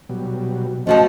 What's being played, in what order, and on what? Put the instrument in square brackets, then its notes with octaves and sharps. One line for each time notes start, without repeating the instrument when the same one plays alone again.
[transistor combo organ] B2 F#3 G3
[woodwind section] B2 F3 [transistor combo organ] A3 [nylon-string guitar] C#4 F#4 A4 [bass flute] D#5